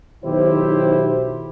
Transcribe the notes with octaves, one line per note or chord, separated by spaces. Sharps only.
B1 D#3 E4 G4 C5